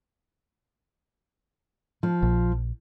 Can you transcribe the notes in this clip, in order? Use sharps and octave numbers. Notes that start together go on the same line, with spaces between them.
F3
A#1